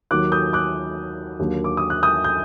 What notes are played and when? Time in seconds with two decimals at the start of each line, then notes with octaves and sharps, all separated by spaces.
0.11 D#2 D#3 F#3 D6 F#6
0.32 D#6 G6
0.53 D6 F#6
1.39 D#2 D3 F#3 A#3
1.64 D6
1.77 D#6
1.90 F#6
2.03 D#6 G6
2.24 G6